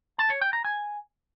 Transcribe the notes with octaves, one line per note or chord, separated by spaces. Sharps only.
A5
C#5
G5
A#5
G#5